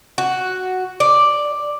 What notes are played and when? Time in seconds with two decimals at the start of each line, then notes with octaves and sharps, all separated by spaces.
0.18 F#4
1.00 D5